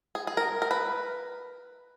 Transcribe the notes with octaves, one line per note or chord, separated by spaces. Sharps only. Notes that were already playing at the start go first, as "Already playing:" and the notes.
G#4
G#4
A#4
A#4
B4